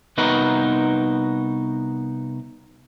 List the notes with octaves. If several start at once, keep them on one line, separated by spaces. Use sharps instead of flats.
C2 B3 D#4 F#4 A#4 B4